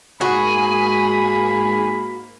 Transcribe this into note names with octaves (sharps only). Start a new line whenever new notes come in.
G#2 A#3 F#4 G#4 B5